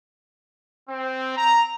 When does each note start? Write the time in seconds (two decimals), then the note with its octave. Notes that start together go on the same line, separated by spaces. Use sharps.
0.88 C4
1.36 A#5